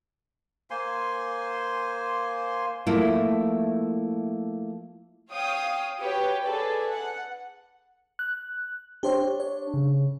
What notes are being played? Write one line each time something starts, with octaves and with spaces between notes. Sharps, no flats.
A#3 C5 G#5 C6
F3 A3 A#3 E4
C#5 F5 G5 D#6
F#4 G4 B4 C#5
G#4 A4 B4 D5
F#5
F#6
D4 G4 C5 C#5
C#5
C#3